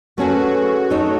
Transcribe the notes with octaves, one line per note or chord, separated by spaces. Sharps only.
A3 C#4 F#4 G#4 B4
A3 D#4 A4 C#5